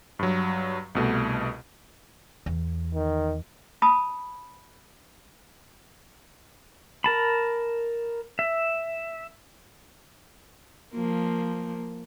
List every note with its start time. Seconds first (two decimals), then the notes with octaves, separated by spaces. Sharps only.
0.19 G2 F#3
0.95 C2 B2 A3
2.46 E2
2.94 D#3
3.82 A5 B5 D#6
7.04 A#4 A5 B5
8.39 E5
10.93 F3 A#3